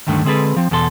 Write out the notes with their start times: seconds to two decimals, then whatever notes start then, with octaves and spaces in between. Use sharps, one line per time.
0.07 D2 G2 D#3 A3 D4
0.25 D3 G#3 C4 G#4 A4 B4
0.56 F3 C4
0.71 E2 B2 A4 C6